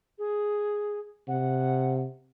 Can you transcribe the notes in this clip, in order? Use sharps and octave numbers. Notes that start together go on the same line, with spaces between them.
G#4
C3 F#5